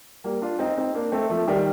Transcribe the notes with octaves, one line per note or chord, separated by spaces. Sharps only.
G3 A#3
D4 F4
C4 D#4
C4 D#4
A#3 D4
A3 C4
F3 A3
D#3 G3